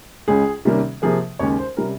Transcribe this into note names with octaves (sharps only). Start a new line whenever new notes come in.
C#2 C#3 G#3 C#4 G#4
C3 D#3 G3 A#3 C#4
C3 F3 A#3 G#4
D#2 C#3 G#3 C#4 C#5
C5
C3 G3 C#4 A#4